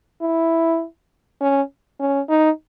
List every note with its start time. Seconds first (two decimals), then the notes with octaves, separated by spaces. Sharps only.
0.21 E4
1.40 C#4
2.00 C#4
2.29 D#4